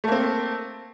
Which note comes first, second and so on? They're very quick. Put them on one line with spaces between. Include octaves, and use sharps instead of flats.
A3 A#3 C4